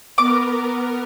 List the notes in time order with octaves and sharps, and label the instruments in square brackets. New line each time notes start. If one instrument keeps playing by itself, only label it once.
[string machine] B3 A#4 [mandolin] D6